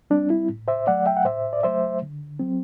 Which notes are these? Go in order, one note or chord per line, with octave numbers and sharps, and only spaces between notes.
G3 C4 D4
E4
A2
C5 E5
F#3 A3 D5 F#5
E5 G5
F#5
A2 C5 E5
D5
F#3 A3 C5 E5
D3
F#3 C4